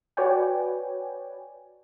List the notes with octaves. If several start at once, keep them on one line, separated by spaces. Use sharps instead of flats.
F#4 B4 C#5 D5 G5 G#5